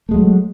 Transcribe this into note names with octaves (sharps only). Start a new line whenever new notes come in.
F#3 G#3 A3